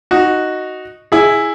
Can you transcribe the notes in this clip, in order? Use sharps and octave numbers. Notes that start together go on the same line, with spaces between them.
D#4 F#4
E4 G#4